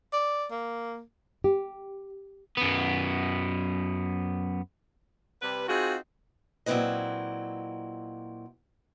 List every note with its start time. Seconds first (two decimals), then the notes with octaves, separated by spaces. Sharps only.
0.13 D5
0.51 A#3
1.44 G4
2.57 F#2 B3
5.42 C3 G3 B4
5.69 C4 D#4 F4 F#4 G#4
6.66 A#2 F#3 C4 E4 B4 D#5